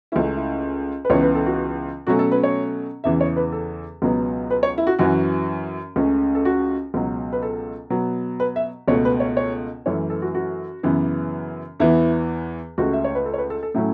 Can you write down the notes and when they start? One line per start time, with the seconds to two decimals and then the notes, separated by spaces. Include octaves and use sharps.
0.12 C#2 C#3 A3 C#4 E4
0.36 E4
1.05 B4
1.10 C#2 C#3 E3 B3 C#5
1.22 B4
1.35 A4
1.46 F#4
2.07 B2 F#3 A3 C#4 F#4
2.19 A4
2.32 B4
2.43 C#5
3.04 E2 C#3 E3 E5
3.21 C#5
3.36 B4
3.52 A4
4.02 C#2 B2 F#3 B3
4.50 B4
4.63 C#5
4.78 E4
4.87 F#4
4.99 F#2 E3 C#4 F#4
5.96 C#2 C#3 A3 C#4
6.35 A4
6.45 F#4
6.94 C#2 B2 F#3
7.33 B4
7.42 A4
7.90 B2 F#3 B3
8.40 B4
8.56 E5
8.88 C#2 B2 A3 C#5
9.05 B4
9.20 C#5
9.37 C#5
9.86 F#2 E3 A3 C#4 C#5
10.10 A4
10.22 F#4
10.35 F#4
10.83 F#2 C#3 E3 B3
11.80 E2 E3 B3 E4
12.78 C#2 C#3 A3 F#4
12.93 E5
13.04 C#5
13.15 B4
13.26 A4
13.34 C#5
13.38 B4
13.50 A4
13.63 A4
13.74 A2 F#3 A3 C#4 E4